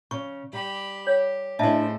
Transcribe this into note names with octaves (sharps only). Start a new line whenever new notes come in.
C#3 C#6
G3 G4 B5
G4 C#5
A2 C#3 D4 E4 C5 D#5 E5 A5